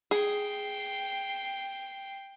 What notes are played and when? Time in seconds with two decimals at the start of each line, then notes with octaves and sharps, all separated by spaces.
0.11 G#4 G5 C7